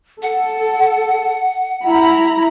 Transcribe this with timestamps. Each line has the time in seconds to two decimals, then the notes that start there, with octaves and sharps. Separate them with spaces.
0.23 A4 F#5
1.85 E4 A#5 B5